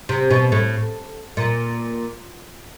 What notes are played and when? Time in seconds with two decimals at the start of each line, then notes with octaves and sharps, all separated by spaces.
0.09 C3
0.30 B2
0.52 A2
1.37 A#2